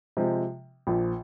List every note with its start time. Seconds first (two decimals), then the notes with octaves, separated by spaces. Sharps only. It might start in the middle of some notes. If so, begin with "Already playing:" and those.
0.17 C3 F3 G#3
0.87 A#1 A#2 F3